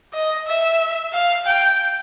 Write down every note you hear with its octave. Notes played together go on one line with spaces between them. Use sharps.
D#5
E5
F5
G5